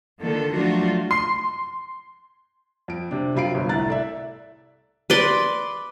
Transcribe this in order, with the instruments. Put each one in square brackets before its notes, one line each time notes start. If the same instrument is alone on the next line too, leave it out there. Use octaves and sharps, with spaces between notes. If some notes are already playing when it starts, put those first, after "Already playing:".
[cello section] D3 D#3 A#3 F4 A4
F3 F#3 A3 D4 F4 F#4
[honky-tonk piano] C6 C7
[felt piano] F2 D7
C3 D4
F#2 C3 F4 B5 C7 D7
G1
C2 A2 A#5 F#6 A6
A4 D5 E5
[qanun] B4 D5 C6